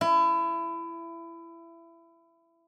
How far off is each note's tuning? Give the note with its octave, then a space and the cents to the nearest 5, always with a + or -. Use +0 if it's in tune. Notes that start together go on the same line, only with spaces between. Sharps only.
E4 +25